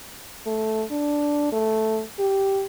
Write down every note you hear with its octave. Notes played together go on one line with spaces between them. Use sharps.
A3
D4
A3
G4